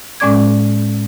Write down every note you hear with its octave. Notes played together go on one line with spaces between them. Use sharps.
A2 G#3 C#4 D5 D6 G#6